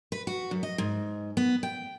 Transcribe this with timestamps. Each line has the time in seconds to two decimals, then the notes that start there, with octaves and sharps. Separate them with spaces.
0.12 B4
0.27 F#4
0.51 F#2
0.63 D#5
0.78 G#2
1.37 B3
1.63 G5